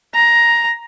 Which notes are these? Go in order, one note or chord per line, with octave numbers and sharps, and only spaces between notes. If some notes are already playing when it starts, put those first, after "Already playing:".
A#5